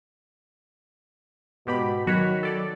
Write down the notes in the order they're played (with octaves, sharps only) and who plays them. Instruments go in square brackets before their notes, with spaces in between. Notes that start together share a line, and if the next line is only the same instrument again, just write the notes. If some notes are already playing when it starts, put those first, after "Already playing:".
[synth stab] G#2 G4 B5 [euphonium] B2
[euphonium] D#3 [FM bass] F#3 [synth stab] F#4 C#5 B5
[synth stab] A4 D5